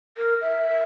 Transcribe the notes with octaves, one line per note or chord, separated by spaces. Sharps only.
A#4
E5